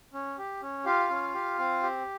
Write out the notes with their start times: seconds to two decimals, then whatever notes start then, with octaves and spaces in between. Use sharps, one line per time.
0.13 C#4
0.38 G4
0.62 C#4
0.85 F4 G4 F5
1.10 C#4
1.34 G4
1.59 C4
1.83 G4